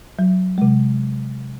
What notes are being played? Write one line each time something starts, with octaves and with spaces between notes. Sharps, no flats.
F#3
C3 G#3